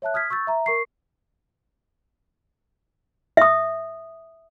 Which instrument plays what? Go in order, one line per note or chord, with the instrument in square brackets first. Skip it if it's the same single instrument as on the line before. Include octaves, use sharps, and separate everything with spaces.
[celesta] C#5 E5 A5 F#6
D#6 F6 G#6 B6
C#6 E6 G6 A6
E5 A#5
A#4 C#6 C7
[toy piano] E5 D#6